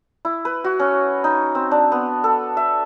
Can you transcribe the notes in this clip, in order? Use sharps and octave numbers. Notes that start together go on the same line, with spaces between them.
E4
B4
F#4
C#4
D#4
C4
D4
B3
A4
E5